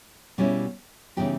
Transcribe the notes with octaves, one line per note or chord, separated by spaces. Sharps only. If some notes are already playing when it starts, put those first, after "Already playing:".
B2 G3 A#3 C#4 E4
C#3 E3 G3 B3 D#4 G4